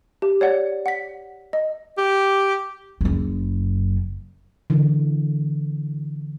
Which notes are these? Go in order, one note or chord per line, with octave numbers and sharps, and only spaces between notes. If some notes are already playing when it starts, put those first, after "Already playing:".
G4
C#5 D5 F#5
F#5 B6
D#5
G4
F#1 F#2
D3 E3